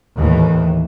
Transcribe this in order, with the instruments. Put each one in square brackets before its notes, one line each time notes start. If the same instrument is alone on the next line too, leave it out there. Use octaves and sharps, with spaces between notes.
[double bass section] D#2 A2 E3